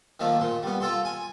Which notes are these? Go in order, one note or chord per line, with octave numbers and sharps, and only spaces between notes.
D#3 F3 A3 A#3
A#2 C6
G3 B3
F4 A4 C6
G#5